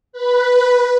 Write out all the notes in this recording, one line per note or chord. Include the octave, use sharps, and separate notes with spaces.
B4